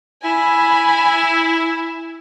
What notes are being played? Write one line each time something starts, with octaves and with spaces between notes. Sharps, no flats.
E4 G#5 B5